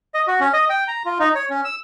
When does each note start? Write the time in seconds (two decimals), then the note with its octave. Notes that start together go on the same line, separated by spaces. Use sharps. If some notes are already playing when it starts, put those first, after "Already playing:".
0.14 D#5
0.27 F#4
0.40 C#4
0.53 D#5
0.70 G5
0.88 A#5
1.05 F4
1.19 D#4
1.35 C#5
1.50 C#4
1.65 E6